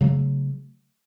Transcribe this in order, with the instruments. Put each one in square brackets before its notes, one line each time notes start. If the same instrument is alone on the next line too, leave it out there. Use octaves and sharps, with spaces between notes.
[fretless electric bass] C#3 F#3 A3